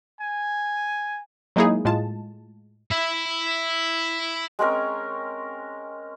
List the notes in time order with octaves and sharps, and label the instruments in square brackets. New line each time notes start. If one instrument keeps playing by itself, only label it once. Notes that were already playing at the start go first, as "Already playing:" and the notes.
[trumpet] G#5
[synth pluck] F#3 G#3 A#3 D#4 E4 G#4
A2 G#3 F4 A5
[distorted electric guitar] E4 E5
[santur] G#3 C4 C#4 A#4